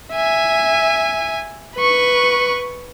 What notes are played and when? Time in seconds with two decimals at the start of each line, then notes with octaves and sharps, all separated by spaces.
0.13 E5 G#5
1.76 B4 C#6